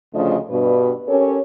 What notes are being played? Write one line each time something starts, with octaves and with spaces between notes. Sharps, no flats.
D2 C#3 F3 A3 D4 D#5
G2 B2 B4
C#4 G4 A4 A#4 C#5